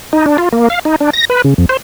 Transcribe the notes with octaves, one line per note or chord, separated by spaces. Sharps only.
D#4
D4
F4
A#3
F5
D#4
D4
A#6
B4
C#3
F2
C5